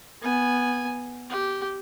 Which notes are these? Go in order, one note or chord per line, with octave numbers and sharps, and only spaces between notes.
B3 G#5
G4